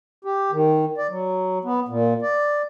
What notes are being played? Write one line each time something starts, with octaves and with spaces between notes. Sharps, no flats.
G4
D#3
D5
F#3
B3
A#2
D5